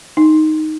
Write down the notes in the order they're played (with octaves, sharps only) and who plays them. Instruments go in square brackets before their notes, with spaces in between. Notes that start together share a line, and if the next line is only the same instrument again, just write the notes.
[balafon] D#4